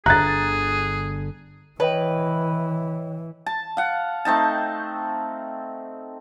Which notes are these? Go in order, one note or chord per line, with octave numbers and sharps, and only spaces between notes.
G1 D3 G#4 A#5 F#6 A6
E3 B4 C#5 D#5 G5
A5
F5 F#5
A3 C4 D#4 A5